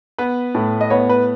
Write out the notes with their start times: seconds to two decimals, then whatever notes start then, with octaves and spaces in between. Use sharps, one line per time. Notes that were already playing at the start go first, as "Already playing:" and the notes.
0.18 B3 B4
0.55 A2
0.81 D#5
0.90 B3 C#5
1.09 B4